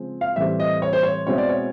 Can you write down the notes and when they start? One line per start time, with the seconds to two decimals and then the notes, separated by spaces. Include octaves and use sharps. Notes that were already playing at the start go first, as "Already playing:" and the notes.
Already playing: C#3 F3 G#3 C4
0.21 F5
0.36 A2 E3 G3 C4 E5
0.60 D#5
0.82 C#5
0.93 C5
1.03 C#5
1.27 B2 G#3 C4 E4 C#5
1.38 D5
1.49 C#5